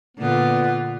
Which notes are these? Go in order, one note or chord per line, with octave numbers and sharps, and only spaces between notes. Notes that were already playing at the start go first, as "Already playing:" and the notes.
A#2 D3 B3 F4